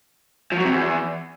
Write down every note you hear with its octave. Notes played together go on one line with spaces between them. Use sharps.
F3
F#3
C3
E2